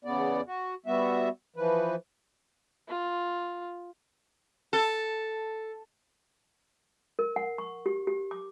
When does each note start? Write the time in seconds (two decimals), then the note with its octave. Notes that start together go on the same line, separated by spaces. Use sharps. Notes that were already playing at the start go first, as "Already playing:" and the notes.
0.05 E2 C#3 B3 D5
0.47 F#4
0.86 G3 B3 F#4 E5
1.56 E3 F3 B4
2.89 F4
4.73 A4
7.19 A#4
7.36 F#5
7.58 C#6
7.86 G4
8.07 G4
8.31 D6